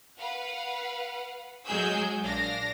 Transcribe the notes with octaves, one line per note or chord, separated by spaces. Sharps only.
B4 F5 F#5
F#3 G#3 G#4 G#5 E6 G6
A#1 D4 F5 A#6